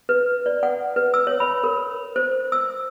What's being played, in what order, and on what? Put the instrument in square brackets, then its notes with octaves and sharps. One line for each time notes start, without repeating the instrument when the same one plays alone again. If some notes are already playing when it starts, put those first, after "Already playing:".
[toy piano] B4
D5
F#5
B4
E6
C#5
B5
A#4
C5
E6